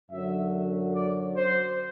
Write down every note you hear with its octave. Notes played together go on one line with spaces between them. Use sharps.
F#2 D3 F#3 E5
D5
C5